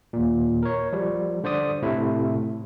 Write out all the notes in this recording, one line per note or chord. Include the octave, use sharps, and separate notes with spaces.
D#2 A#2
A#4 C#5
F3 G3
D3 C5 D5 D#6
A2 C3 A3 E4